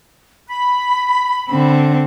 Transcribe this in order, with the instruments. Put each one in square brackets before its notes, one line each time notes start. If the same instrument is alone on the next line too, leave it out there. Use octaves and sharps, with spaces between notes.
[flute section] B5
[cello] D3 C4